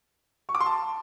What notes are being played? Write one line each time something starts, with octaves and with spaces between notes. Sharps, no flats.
C#6
D6
C6
A5